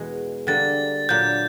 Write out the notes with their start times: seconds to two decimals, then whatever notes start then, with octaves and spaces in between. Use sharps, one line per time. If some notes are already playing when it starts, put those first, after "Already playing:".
Already playing: E2 B2 G#3
0.47 D3 G3 A#3 A6
1.09 A#2 F#3 A#3 D4 G6